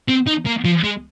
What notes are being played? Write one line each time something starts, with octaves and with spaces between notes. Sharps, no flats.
C4
D#4
A#3
F3
G#3